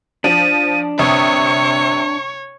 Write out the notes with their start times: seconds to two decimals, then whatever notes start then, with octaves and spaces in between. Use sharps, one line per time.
0.24 F3 D4 D#7
0.99 G1 C3 C#5 C#6 D#6